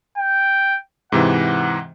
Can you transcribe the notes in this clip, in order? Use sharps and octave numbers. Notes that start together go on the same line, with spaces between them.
G5
G#2 C3 E3 F#5